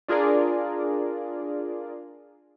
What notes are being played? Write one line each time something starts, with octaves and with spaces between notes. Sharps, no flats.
D4 F4 G#4 A#4 D5